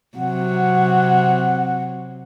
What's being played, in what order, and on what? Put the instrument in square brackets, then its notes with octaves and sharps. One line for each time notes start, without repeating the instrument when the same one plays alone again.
[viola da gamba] C3 F#3 [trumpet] F#5